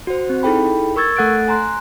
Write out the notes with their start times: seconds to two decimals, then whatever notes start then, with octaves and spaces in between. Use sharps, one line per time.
0.07 F#4 C5
0.30 C4
0.43 D#4 E4 G#4 A4 G5 B5
0.96 A#4 C#6 E6 G#6 A6
1.17 A3 A4 F#5 F#6 A6 D7
1.48 G#5 A#5 C6 F#6